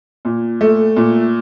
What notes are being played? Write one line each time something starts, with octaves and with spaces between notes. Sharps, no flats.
A#2
A3
A#2